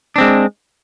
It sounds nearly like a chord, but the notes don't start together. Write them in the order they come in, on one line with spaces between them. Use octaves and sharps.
D4 C4 G#3